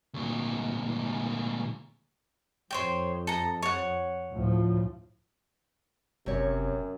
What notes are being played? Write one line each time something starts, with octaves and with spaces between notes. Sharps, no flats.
D2 A#2
F2 C5 C#5 G5
A4 A#5
C#5 F#5
D2 A2 F3
F#1 F#2 C3 C#5